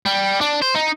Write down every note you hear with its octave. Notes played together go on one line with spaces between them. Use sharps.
G3
D4
C5
D#4